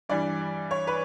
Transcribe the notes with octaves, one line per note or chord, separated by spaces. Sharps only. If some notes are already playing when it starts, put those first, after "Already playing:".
G2 E3 G3 D5
C#5
B4